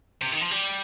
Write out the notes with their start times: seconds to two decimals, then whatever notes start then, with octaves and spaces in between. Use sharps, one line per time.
0.22 C3
0.32 D#3
0.41 F3
0.51 G3